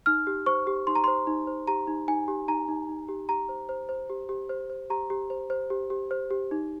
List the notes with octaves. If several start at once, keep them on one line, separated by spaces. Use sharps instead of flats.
D#4 F6
G4
C5 C#6
G4
D#4 C6
A#5
C5 C6
D#4
C5
G4 A#5
D#4
D#4 G#5
G4
D#4 A#5
D#4
D#4
G4
G4 A#5
C5
C5
C5
G4
G4
C5
C5
G4 A#5
G4
C5
C5
G4
G4
C5
G4
D#4